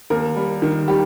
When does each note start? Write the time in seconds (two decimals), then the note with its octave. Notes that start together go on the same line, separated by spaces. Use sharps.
0.10 D#2 A#4
0.36 G3
0.62 D#3
0.88 G3 G4